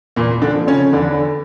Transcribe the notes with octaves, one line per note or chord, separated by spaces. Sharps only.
E2 A#2 A#3
D3 D4
D3 F3
C#3 C#4
E2 D3 D4